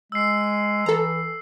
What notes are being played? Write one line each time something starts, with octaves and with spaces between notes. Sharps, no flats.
G#3 E6 C7
E3 A4 A#5